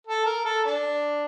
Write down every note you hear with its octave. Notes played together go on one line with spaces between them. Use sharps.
A4
A#4
A4
D4